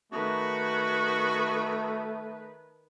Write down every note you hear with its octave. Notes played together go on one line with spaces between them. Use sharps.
D#3 A3 F#4 B4